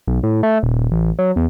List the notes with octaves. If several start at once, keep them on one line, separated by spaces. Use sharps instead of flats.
B1
A2
A3
D#1
A1
F#3
E2